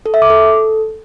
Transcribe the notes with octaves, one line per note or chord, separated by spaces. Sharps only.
A4
E5
D6
A4